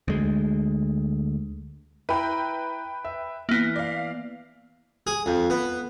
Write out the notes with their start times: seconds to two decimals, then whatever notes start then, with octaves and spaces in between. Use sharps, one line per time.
0.08 D2 G#3
2.09 E4 B4 G5 A#5
3.05 E5
3.49 E3 A#3 B3 E4
3.76 D5 F5
5.07 G#4
5.26 F2
5.50 B3